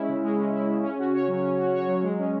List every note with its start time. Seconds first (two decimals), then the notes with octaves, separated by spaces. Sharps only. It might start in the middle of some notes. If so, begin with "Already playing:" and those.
Already playing: G#3 C#4 E4
0.09 C#3
0.24 G#3
0.38 C#4
0.53 E4
0.69 C#3
0.83 C#4
0.99 F#4
1.14 C#5
1.28 F#3
1.43 C#4
1.58 F#4
1.74 C#5
1.88 F#3
2.03 G#3
2.19 C#4